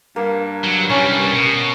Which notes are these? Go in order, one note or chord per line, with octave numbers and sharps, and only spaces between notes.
G2 A#3
F#3
C2 G3 C#4
B2